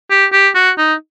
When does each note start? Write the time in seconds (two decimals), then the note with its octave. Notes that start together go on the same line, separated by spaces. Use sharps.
0.10 G4
0.33 G4
0.55 F#4
0.78 D#4